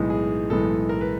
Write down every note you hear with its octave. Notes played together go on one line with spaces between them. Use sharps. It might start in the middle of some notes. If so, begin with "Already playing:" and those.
Already playing: B1 A2 E3 G#3 B3 D#4
G#4
B1 A2 E3 G#3 B3 A4
A#4
B4